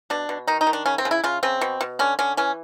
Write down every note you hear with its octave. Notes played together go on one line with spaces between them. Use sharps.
B2 D4
B2
D#3 D#4
D#4
D#3
D4
C#3 C#4
C4
C#3
E4
C#3 F4
C#3 C4
B2
B2
D3 C#4
D3 C#4
E3 C#4